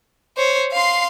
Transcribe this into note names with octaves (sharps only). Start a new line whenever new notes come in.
C5 C#5
F5 C6